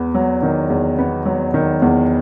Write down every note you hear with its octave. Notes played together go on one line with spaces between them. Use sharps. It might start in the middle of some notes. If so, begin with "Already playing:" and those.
Already playing: E2 B3
F#3
D#3
E2
B3
F#3
D#3
E2